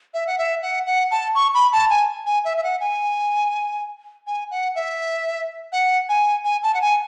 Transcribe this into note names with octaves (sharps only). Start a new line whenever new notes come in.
E5
F#5
E5
F#5
F#5
A5
C#6
B5
A5
G#5
G#5
E5
E5
F#5
G#5
G#5
F#5
E5
F#5
G#5
G#5
A5
F#5
G#5